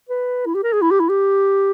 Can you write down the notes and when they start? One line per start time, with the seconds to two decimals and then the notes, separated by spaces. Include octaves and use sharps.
0.09 B4
0.46 E4
0.55 G4
0.63 A#4
0.73 G#4
0.82 E4
0.91 G4
1.00 E4
1.09 G4